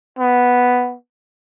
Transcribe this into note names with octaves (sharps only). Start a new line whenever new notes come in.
B3